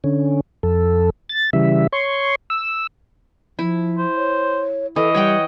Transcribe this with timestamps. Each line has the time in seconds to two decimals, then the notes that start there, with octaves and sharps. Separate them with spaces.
0.04 D3 C#4
0.63 F2 A4
1.29 A6
1.53 C#3 E3 G3 E5
1.92 C#5 C6 C#6
2.50 E6
3.59 F3 E4
3.98 C5
4.16 C#5
4.96 E3 A4 D#5
5.15 G3 C#5 F#5 G5